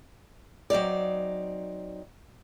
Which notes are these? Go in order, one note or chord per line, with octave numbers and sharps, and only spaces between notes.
F#3 C4 D#4 D5